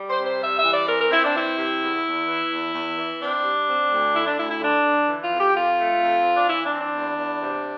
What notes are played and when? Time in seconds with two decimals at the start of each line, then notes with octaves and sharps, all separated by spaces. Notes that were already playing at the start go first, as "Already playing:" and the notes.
Already playing: G3
0.09 C5
0.18 C3
0.25 C5
0.41 G3 E5
0.57 E5
0.65 E3
0.72 D5
0.87 C4 A#4
1.00 A#4
1.10 C4 E4
1.23 D4
1.34 E3 E4
1.57 C3
1.81 E2
2.04 E2
2.27 E3
2.50 E2
2.74 E2
2.97 E3
3.20 C4 D4
3.43 G3
3.67 C4
3.90 D2
4.13 D3 E4
4.25 D4
4.36 D2 E4
4.49 E4
4.60 D3 D4
4.83 D3
5.07 E3
5.23 F4
5.31 F2
5.37 G4
5.53 F2 F4
5.77 A3
6.00 F2
6.23 C4
6.35 D4
6.46 E3 E4
6.62 D4
6.70 C4
6.78 D4
6.93 E2
7.16 E2
7.40 C3